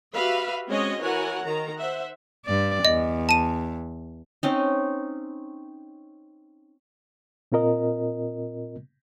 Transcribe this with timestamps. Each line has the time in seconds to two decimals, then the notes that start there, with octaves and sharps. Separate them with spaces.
0.13 F#4 G4 B4 E5 F5 B5
0.68 G#3 C4 C#4 F#4 C#5 D#5
1.00 E3 F#4 A#4 C#5 F#5 G#5
1.45 D#3 A#5
1.76 C5 E5 F#5
2.46 G2 D5
2.85 E2 D#5
3.29 A5 D#7
4.43 C4 C#4 D#4
7.52 A#2 C4 F4 A#4 D#5